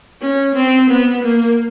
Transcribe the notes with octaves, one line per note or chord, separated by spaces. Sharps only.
C#4
C4
B3
A#3